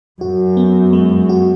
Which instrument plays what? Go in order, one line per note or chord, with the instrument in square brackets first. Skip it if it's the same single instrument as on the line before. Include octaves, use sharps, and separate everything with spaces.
[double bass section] F#2 [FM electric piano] F#4
[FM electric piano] B3
G#3
F#4